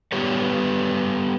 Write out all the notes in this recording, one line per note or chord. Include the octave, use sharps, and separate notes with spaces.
G3 B3 G4 B4 C#5